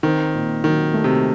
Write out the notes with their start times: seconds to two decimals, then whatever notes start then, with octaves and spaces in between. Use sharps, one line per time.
0.03 D#3 C4
0.34 A#2
0.64 D#3 F#3
0.94 A3
1.04 C3